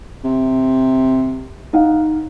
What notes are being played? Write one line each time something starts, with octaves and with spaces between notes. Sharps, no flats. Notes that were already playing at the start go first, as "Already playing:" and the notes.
C3
D#4 F5 F#5